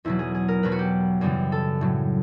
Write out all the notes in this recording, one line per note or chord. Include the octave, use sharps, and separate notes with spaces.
E2 B2 F#3 E4
G#4
G#4
A#4
E2 B2 F#3 B4
F#4
G4
F#2 C#3 E3 G3
A4
A2 F#3